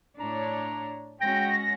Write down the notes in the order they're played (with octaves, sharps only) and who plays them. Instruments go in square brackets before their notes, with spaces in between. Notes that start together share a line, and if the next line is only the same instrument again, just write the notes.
[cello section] A2 D4 C#5 [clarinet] A#5
[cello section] G#3 C#4 F#4 [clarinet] G5 [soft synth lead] A#6